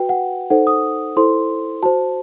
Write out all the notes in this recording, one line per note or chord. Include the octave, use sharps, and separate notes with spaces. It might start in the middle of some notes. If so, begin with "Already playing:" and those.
Already playing: F#4 B4 G5
F#5
D#4 A4 C5 F#5
D#6
E4 A4 C5 C6
F#4 C5 A5